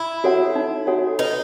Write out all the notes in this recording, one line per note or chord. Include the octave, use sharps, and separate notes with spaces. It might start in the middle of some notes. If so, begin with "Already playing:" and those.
Already playing: E4
F#4 A4 C#5 F#5
D#4
F#4 A4 C#5 F#5
D#4 B4